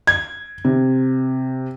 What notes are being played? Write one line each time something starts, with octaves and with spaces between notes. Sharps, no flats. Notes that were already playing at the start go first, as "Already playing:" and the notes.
G#6
C3